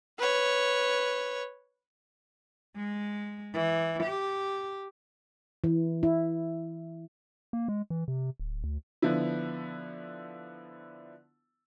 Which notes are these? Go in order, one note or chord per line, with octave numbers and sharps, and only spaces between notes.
B4 C#5
G#3
E3
G4
E3
E4
A#3
G#3
E3
C3
D1
D2
D3 F3 B3 E4